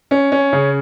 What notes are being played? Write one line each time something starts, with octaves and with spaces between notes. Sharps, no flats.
C#4
C#4
C#3